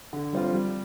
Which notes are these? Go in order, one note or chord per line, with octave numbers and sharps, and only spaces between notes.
D3
G3 C4 F4
G3